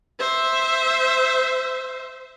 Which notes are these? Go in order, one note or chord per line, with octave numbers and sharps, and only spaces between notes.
C5 E5